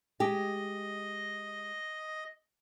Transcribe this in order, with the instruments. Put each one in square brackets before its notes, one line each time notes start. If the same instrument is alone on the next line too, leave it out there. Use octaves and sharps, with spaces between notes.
[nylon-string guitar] G#3 G4 [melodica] D#5